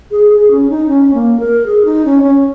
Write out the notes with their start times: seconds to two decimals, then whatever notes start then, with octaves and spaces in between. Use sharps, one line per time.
0.11 G#4
0.31 G#4
0.51 C#4
0.70 D#4
0.88 C#4
1.14 A#3
1.40 A#4
1.66 G#4
1.85 D#4
2.05 C#4
2.24 C#4